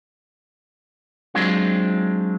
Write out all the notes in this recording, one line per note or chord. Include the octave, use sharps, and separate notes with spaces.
F#3 G#3 C4 D4 F4